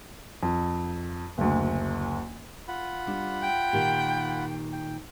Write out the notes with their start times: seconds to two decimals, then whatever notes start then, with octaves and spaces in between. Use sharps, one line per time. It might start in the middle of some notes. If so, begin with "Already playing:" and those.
0.43 F2
1.38 F#1 D2
2.68 F4 F#5 B5
3.07 G3 D4
3.42 G5
3.73 A#2 D#3 G4
4.73 G5